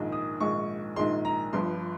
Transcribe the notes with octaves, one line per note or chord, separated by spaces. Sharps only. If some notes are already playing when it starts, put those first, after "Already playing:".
Already playing: A#1 G#2 D#3 G#3
D#6
A#1 G#2 D#3 G#3 C#6
A#1 G#2 D#3 G#3 C6
A#5
G1 G2 F3 C6